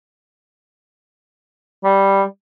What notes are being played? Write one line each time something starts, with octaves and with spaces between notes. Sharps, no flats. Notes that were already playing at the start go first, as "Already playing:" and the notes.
G3